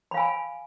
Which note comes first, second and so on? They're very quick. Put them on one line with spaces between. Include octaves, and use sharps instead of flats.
B5 F5 G#5